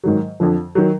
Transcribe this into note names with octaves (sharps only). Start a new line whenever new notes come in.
G#2 D#3 F#3
F2 D3 F3
D#3 F#3